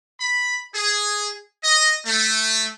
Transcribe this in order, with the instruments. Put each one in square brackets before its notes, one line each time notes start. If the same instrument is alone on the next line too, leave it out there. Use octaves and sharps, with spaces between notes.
[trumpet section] B5
G#4
D#5
A3